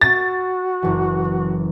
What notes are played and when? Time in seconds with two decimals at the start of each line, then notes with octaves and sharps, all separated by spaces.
0.01 F#4 A6
0.82 F#1 E3